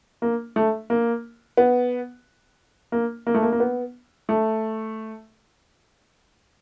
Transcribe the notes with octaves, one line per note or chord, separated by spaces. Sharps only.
A#3
A3
A#3
B3
A#3
A#3
A3
A#3
A#3
B3
A3